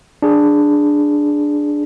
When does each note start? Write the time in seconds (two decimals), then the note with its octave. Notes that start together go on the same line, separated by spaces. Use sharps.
0.22 D4 G#4